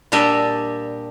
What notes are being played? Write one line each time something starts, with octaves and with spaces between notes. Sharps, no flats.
A#2 G3 D4 G4 D#5 E5